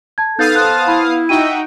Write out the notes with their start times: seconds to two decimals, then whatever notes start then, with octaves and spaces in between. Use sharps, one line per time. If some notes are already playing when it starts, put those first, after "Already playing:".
0.18 A5 G#6
0.39 B3 D#4 A4 F5 D#6 G6 A6
0.55 C5 A5 F#6
0.88 E4 B5
1.29 D#4 F#4 E5 G5 D#7